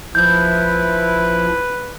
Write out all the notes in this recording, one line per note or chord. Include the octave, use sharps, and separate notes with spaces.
A#1 F3 E4 B4 G6